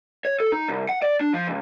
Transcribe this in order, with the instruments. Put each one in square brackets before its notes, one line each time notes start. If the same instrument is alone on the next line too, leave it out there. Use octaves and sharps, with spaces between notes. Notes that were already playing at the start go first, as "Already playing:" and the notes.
[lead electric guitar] C#5
A4
D#4
C2
F#5
D5
D4
F3
C#2